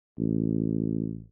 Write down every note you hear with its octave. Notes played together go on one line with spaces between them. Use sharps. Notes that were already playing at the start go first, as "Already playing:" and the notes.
A1